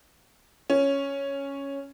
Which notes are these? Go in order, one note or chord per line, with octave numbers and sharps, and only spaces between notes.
C#4